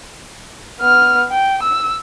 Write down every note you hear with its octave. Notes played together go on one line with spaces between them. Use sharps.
B3 F6
G5
E6